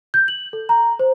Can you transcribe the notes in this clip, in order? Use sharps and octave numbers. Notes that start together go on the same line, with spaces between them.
G6
F#7
A4
A#5
C5